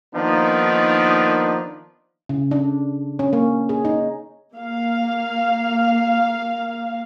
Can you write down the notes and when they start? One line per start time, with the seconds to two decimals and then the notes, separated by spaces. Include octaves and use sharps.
0.14 D#3 F3 A#3 B3 D4 D#4
2.29 C#3
2.51 D4
3.19 C#4
3.33 A#3
3.69 G#4
3.85 D#4
4.56 A#3 F5